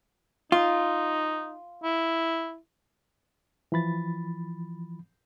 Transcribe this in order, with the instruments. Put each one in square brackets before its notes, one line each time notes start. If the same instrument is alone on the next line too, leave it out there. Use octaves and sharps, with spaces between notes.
[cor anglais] D#4 [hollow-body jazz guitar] F4
[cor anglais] E4
[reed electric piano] E3 F3 B5 A6